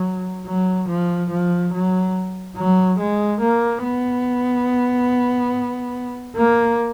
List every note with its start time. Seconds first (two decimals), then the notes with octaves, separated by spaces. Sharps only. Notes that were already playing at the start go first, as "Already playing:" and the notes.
Already playing: F#3
0.46 F#3
0.89 F3
1.30 F3
1.73 F#3
2.57 F#3
2.99 G#3
3.41 A#3
3.84 B3
6.36 A#3